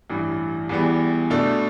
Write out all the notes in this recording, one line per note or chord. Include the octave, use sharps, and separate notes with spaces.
A1 G2 E3
E2 E3 G3 B3
B2 A3 D4 A4